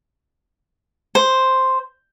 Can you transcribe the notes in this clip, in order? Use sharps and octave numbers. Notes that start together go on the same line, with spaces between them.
C5